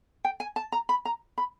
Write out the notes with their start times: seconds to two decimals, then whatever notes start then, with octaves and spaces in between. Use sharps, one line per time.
0.25 G5
0.40 G#5
0.56 A5
0.72 A#5
0.89 B5
1.05 A#5
1.38 B5